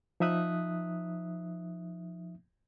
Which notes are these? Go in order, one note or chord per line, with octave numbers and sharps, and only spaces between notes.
F3 D#4 E5 D#6 F#6